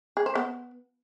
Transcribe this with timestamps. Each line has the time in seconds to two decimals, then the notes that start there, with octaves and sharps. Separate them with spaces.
0.17 G#4
0.26 C5
0.35 B3